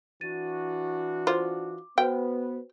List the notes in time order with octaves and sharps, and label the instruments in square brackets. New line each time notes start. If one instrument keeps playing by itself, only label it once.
[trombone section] E3 D4 F#4 [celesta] A6 D#7
[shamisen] F4 C5 [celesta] D6
[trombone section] B3 [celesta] F#4 B4 C5 [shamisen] G5